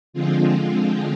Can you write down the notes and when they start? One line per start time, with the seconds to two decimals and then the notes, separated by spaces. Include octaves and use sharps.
0.13 D3 F3 G#3 C4 F4